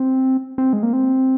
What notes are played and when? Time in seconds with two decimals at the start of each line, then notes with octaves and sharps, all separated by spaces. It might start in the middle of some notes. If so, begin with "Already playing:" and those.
Already playing: C4
0.58 C4
0.73 G#3
0.83 A#3
0.93 C4